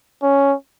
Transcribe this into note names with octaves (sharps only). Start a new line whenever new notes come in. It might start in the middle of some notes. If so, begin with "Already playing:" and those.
C#4